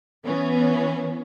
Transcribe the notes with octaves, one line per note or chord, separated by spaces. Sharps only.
E3 B3 C#4